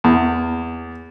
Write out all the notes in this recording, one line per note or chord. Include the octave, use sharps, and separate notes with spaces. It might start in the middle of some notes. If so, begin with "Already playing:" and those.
E2